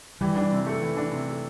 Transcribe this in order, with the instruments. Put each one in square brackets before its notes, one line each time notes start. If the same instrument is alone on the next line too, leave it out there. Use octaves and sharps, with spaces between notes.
[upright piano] E3 [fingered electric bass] G3
[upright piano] D4
C3
A3
E3
D4
C3
A3